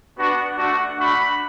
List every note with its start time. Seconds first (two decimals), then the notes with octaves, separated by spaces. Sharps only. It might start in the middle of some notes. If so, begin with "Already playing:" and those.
0.18 B3 D4 F#4
0.57 A3 D4 F#4
0.98 A3 D4 F#4 B5